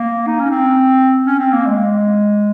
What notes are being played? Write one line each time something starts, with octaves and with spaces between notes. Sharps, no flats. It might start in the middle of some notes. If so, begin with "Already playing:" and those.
Already playing: A#3
D#4
C#4
C4
C#4
C4
A#3
G#3